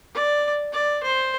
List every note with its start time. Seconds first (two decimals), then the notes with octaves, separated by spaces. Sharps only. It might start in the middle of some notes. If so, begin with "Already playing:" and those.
0.15 D5
0.73 D5
1.03 C5